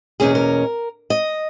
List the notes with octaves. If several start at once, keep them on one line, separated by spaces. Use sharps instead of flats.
E2 B2 A#3 C#4 G#4
A#4
D#5